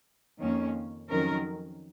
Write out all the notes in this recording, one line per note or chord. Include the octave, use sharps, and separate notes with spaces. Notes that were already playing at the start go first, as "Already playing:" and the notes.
F2 D#3 A#3 C#4
F2 D#3 F#3 C#4 A#4